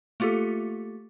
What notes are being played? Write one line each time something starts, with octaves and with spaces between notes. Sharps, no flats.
A3 A#3 F4 G4 A4